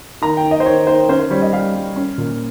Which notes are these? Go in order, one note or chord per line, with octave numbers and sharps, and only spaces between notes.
D#3 A#5
G5
D#3
D#5
C5
D#3 C#5
D#3 C5
C#4 C5
C5
G3 C#5
D#5
G3 F5
G3
C#4
A#2